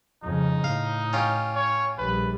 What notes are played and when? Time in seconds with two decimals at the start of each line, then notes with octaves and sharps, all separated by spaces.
0.23 F2 C#3 D#4
0.64 A2 F5
1.13 C#4 F4 G4
1.55 C#5
1.98 A#1 G3 B4